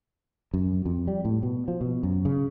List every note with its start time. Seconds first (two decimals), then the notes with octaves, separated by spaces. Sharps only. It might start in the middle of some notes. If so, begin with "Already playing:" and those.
0.54 F#2
0.86 F2
1.08 G3
1.25 A2
1.43 B2
1.68 F3
1.81 B2
2.03 F#2
2.25 C#3